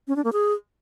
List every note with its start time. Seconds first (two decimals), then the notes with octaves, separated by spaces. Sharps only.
0.08 C#4
0.16 D4
0.24 A#3
0.33 G#4